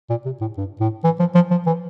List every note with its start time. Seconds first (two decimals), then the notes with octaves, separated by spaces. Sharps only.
0.10 A#2
0.26 C3
0.41 A2
0.57 G2
0.80 A2
1.04 E3
1.20 F3
1.35 F3
1.51 F3
1.67 E3